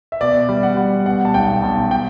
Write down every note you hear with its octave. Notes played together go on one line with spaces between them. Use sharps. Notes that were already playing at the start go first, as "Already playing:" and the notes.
E5
B2 D5
G3
F#5
G3
B2 F#5
A5
B1 G5
B1 A5
G5